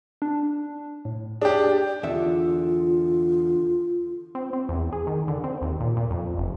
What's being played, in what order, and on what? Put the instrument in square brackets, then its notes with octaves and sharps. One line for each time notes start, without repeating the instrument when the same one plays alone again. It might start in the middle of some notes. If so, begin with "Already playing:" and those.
[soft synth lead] D4
A2
[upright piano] D4 G4 [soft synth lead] G#4
[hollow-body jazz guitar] E2 D3 E5 [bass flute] F4
[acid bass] C4
C4
E2
G#4
D#3
D3
C4
D#2
A#2
A#2
F2
F#1